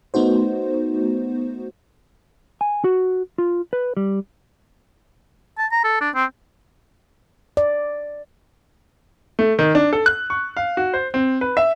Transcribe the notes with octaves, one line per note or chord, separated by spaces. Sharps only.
A3 B3 D#4 F#4 C5
G#5
F#4
F4
B4
G3
A5
A#5
A4
D4
C4
D5
A3
D#3
D4
A4
F#6
C#6
F5
F#4
C5
C4
B4
E5